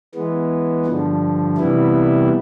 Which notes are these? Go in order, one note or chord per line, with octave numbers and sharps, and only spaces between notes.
E3 G#3 B3
G2 D3 F3
C3 E3 G3 B3 E4